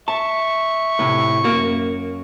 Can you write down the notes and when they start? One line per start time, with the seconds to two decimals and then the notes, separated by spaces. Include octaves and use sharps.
0.08 E5 A5 C#6
0.99 A2 C3
1.44 F#2 A#3 F#4